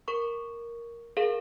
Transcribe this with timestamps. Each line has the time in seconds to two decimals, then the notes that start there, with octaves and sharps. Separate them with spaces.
0.08 A#4 C#6
1.17 G#4 A#4 F5